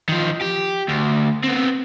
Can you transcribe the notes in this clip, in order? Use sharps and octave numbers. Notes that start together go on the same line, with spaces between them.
D#3 F3
G4
D2
B3 C4